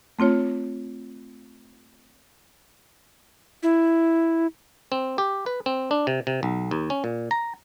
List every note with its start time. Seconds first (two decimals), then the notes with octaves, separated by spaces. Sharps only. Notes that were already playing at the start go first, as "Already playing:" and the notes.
0.19 A3 C4 F4 C#5
3.63 E4
4.92 C4
5.18 G4
5.46 B4
5.66 C4
5.91 D4
6.07 C3
6.27 C3
6.43 B1
6.71 D#2
6.90 C#4
7.04 A#2
7.31 A#5